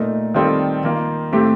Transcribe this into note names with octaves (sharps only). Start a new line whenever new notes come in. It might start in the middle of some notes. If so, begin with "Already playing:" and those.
Already playing: A#2 A3 D#4 A#4
D#3 G3 C4 F4 A4
D#3 A#3 F4
A2 A3 C4 G4